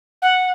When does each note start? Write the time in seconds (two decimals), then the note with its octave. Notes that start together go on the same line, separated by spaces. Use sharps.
0.22 F#5